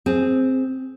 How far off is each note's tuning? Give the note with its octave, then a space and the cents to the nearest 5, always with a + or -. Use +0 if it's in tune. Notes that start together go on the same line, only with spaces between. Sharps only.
C4 +0 G#4 +0